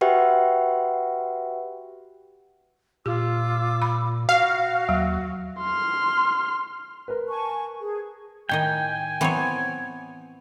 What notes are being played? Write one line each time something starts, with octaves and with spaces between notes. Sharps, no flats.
F#4 G4 B4 E5 F#5 G5
A#2 F4 G4 D6 E6
B5
F#4 F5 F#5
D#2 F#3
C6 F6
A#4 B4
G#5 A5 C#6
G#4
A2 D#3 D#5 G5 G#5
E3 F#3 B3 C4 C#5